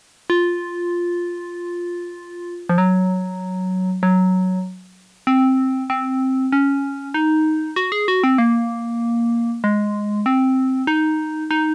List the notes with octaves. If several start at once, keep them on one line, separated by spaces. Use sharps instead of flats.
F4
F3
F#3
F#3
C4
C4
C#4
D#4
F#4
G#4
F#4
C4
A#3
G#3
C4
D#4
D#4